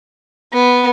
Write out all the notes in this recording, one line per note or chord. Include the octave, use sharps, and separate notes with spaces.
B3